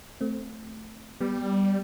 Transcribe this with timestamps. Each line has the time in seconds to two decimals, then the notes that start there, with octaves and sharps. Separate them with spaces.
0.21 A3 C4
1.21 G3 B3